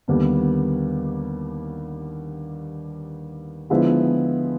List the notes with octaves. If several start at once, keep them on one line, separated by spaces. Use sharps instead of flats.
D#2 D3 G3 B3 D4
D3 F3 G#3 B3 E4